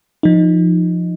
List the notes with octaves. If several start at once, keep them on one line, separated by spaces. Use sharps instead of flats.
F3 D#4